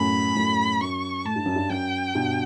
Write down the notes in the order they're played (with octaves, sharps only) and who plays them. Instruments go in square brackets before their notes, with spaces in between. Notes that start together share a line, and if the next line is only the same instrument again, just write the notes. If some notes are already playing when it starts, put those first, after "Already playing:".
Already playing: [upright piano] F#2 A2 [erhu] B5
[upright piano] F#2 A2
[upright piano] F#2 [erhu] C#6
[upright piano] A2 [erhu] A5
[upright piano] G2
F#2
G2
[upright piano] F#2 [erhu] G5
[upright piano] G2 B2